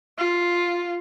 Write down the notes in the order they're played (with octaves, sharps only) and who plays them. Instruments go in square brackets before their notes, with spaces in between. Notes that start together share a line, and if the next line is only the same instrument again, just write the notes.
[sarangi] F4